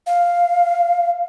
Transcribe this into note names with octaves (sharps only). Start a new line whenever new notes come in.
F5